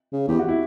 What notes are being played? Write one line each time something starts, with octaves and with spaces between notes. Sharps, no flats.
C#3
E2 G4
F#4
E4